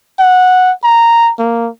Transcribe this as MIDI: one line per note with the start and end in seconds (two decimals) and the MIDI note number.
0.19 0.71 78
0.83 1.31 82
1.39 1.69 58